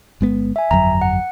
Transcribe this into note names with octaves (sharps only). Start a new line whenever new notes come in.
G1 G#3 B3
E5 G#5
G1 F2 F#3 A#5
F#5